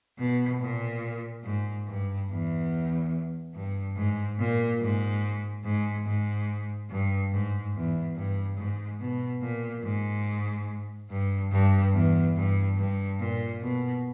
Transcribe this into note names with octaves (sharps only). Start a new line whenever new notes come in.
B2
A#2
G#2
G2
E2
G2
G#2
A#2
G#2
G#2
G#2
G2
G#2
E2
G2
G#2
B2
A#2
G#2
G2
G2
E2
G2
G2
A#2
B2